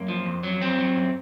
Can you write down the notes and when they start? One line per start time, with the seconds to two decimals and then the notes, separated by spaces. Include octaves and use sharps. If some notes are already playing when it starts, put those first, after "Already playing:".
Already playing: F#2 A#3
0.08 F3
0.26 F2
0.43 F#3
0.61 F2 C4
0.78 F#3
0.96 F#2